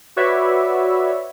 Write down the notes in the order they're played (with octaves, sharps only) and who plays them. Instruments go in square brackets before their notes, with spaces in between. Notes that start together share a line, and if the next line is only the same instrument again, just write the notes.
[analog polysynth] F#4 B4 C#5 D5 E5